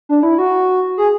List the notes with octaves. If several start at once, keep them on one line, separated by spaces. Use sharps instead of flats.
D4
E4
F#4
G#4